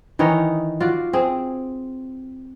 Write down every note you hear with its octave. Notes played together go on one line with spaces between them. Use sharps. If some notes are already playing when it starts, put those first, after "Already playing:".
D#3 E3 D#4 C#5
F4 F#4 D5
C4 G#4